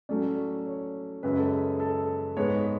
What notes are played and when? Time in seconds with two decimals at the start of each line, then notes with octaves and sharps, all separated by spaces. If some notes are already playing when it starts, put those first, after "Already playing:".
0.09 A2 F#3 A3 C#4 D5
0.66 C#5
1.23 F#2 C#3 G#3 B4
1.37 A4
1.51 G#4
1.80 A4
2.37 G#2 G#3 B3 C#5